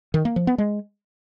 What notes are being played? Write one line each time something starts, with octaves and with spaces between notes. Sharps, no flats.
D#3
A#3
F3
B3
G#3